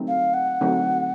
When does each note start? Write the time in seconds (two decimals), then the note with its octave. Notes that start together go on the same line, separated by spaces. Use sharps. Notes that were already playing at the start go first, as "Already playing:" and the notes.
Already playing: D3 F#3 A3 C4 D#4
0.08 F5
0.34 F#5
0.61 D3 F#3 A3 C4 D#4